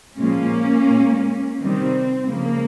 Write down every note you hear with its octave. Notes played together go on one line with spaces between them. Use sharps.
A#2 F3 G#3 A#3 C#4
A#2 G#3
C3 D#3 G3 C4
C#3 F3 G#3 A#3